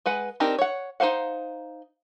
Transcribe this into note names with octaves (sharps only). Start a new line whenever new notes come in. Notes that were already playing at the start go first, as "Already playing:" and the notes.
G#3 B4 F#5
C4 D4 D#4 G4 A#4
C#5 F#5
D#4 B4 C5 F5 F#5